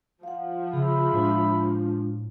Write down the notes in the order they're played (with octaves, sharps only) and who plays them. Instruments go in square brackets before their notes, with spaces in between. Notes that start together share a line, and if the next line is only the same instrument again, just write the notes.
[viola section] F3 [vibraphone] F5 F#5
[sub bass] C#3 [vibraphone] G#4 [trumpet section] E5 B5
[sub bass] A2 [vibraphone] G#3 D4 F4